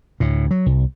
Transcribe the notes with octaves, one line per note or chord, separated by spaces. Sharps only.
D2 A2
F#3
C2